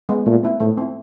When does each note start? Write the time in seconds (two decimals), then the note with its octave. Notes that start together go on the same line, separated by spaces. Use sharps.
0.09 G#3 B3
0.26 A#2 A3
0.43 C4 E4
0.60 A2 A3
0.77 C4 E4